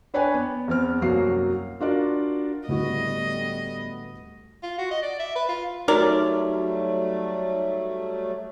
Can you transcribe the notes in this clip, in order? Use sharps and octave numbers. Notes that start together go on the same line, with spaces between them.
D4 B4 C#5 D5 G5 G#5
B3
E2 B3 C4 F6
C2 F#2 F#3 A#3 F#4 C7
D4 F4 F#4 A#4 D5
D1 G3 A3 B3 E4 F#4 D#5
F4
F#4
D#5
D5
E5
B4
F4
F#3 G3 A3 D#4 F#4 A#4 D5